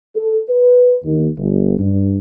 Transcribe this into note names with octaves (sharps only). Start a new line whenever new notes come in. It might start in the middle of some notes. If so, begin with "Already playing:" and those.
A4
B4
D#2
G1
G2